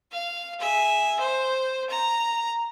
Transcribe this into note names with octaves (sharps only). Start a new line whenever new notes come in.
F5
G#4 E5
C5
A#5